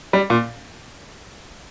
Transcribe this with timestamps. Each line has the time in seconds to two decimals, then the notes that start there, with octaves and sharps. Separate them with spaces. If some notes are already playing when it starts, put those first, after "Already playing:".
0.13 G3
0.30 A#2